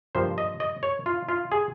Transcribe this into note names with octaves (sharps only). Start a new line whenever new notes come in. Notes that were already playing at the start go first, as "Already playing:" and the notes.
G2 F3 A#3 C5
D#5
D#5
C#5
F4
F4
G#4